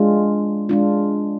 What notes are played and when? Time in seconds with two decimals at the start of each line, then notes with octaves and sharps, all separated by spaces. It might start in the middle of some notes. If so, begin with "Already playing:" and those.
Already playing: G#3 D4 F4
0.69 G#3 D4 F4